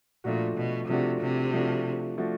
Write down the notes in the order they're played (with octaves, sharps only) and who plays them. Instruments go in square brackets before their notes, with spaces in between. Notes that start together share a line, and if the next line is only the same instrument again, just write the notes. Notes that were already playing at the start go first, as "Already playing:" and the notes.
[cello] A#2 [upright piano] F3 A3 D4 F#4
[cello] B2
[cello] C3 [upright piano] F3 A3 D4 F#4
[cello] C3
[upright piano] F3 A3 D4 F#4
F3 A3 D4 F#4